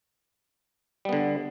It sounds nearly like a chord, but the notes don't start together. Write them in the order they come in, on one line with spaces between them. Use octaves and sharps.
G3 B3 D3